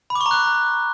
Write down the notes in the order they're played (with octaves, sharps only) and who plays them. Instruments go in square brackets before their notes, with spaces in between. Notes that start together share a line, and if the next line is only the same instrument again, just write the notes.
[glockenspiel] B5
D6
C#6
A#5
F#6